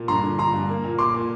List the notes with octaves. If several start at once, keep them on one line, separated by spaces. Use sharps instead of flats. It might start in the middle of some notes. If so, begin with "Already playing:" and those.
Already playing: A#2
G2 A#5 C6
D3
D3 A#5 C6
G2
A#3
A#2
A#2 C6 D6
A#2